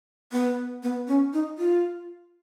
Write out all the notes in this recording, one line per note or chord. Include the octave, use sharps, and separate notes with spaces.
B3
B3
C#4
D#4
F4